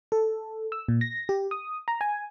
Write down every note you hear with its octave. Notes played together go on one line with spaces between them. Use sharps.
A4
E6
A#2
A#6
G4
D#6
A#5
G#5